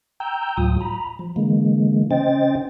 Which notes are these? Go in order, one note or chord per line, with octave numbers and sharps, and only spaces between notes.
G5 A#5 E6 G6
D2 A2 F#3 F4 D#6
A#5 B5
F3
D3 E3 G#3 A#3
C#3 C#4 C5 D#5 G5 A6